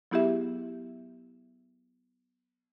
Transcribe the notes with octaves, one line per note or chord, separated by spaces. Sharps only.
F#3 B3 E4 G4 G#4 E5